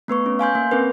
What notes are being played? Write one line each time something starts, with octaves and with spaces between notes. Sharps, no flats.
A3 B3 B4 C#6
C#4
F5 G#5 C6 G6
A#3
C4 C#4 A#4 B4